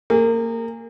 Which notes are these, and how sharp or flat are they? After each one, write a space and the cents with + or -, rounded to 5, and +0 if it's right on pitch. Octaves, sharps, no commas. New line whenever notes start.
A#3 -25 G#4 -25